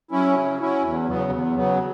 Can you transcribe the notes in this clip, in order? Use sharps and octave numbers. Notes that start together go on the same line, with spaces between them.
F#3 C#4 E4
C#3
F#3 C#4 E4
E2
C#3 F#3 B3
E2
C#3 F#3 B3